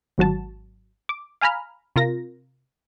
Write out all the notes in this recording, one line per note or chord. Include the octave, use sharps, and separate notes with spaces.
G#1 F#3 F#4 A5
D6
F5 G#5 A#5 B5 F6
C3 F4 A#4 A#6